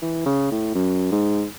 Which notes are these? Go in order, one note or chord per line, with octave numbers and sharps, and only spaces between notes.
E3
C#3
A2
F#2
G#2